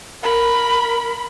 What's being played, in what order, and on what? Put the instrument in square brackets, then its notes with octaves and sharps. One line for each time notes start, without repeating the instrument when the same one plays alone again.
[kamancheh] A#4 B5